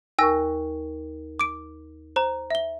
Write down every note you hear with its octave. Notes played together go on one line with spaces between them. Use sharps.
D#2 A#4 G#5 C#6 E6 A#6
D6 D7
C5 A#5
E5 G7